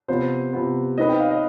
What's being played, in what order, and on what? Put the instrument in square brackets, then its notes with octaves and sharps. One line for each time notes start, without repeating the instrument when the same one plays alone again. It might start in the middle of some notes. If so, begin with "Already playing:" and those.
[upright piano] C3 F3 B3 [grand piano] C5
[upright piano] C3 F3 B3
[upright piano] C4 D#4 B4 [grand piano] D#5
[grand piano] G5
F5
D#5